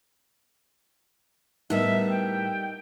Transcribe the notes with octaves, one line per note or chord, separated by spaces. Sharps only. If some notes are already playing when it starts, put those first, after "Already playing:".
A2 G3 B3 D#4 A#4 D#5 E5
G5